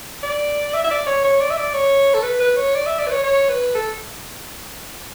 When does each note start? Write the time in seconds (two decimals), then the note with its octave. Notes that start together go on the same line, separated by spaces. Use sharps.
0.23 D5
0.74 E5
0.84 E5
0.91 D5
1.07 C#5
1.24 C#5
1.40 D5
1.50 E5
1.58 D5
1.74 C#5
2.14 A4
2.23 B4
2.40 B4
2.57 C#5
2.74 D5
2.86 E5
2.99 D5
3.07 B4
3.11 C#5
3.24 C#5
3.49 B4
3.75 A4